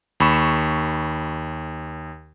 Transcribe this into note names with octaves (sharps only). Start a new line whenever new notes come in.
D#2 B5 C#6 E7